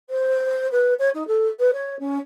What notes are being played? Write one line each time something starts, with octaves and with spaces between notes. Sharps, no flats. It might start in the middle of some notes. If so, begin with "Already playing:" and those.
C5
B4
C#5
D#4
A4
B4
C#5
C#4